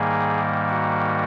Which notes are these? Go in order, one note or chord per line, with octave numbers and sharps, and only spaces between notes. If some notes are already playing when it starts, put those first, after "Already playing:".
Already playing: G#2 D#3 G3 A#3 G#4
F#4